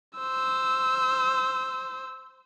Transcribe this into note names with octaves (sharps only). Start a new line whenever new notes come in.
C5 E6